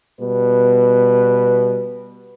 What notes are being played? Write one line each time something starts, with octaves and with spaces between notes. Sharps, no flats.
B2 G3 B4